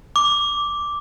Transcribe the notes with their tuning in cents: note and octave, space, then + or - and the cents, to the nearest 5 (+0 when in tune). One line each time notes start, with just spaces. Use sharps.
D6 -5